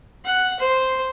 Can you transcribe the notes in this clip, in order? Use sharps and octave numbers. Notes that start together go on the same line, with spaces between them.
F#5
C5